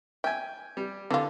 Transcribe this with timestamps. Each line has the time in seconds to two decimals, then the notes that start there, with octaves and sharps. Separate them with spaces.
0.24 E5 G5 G#5
0.77 G3
1.10 D3 E3 F4